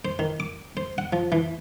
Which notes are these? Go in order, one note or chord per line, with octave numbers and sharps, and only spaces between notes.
C5
D#3
D6
C5
F#5
F3
E3